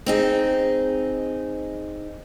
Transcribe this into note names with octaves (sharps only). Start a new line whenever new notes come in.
C4 D#4 G#4